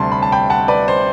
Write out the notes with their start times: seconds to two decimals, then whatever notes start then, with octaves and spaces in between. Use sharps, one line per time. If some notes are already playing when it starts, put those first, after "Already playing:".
Already playing: D2 C3 G3 A5 C6
0.12 B5
0.22 A5
0.32 G5 B5
0.50 F#5 A5
0.68 B4 D5
0.88 C5